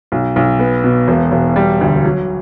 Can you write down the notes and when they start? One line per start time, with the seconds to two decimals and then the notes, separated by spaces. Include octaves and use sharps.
0.12 B1
0.36 B1
0.59 B3
0.84 B2
1.08 E1
1.32 E1
1.56 G3
1.81 D2
2.05 F#3